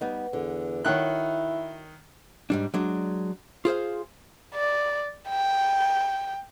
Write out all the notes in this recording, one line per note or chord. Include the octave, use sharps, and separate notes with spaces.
G3 B3 D#4
E2 D3
D#3 E4 F#4 C#5 F#6
G#2 G3 D4
F#3 G#3 D4
F4 G#4 C5 F5
D5
G5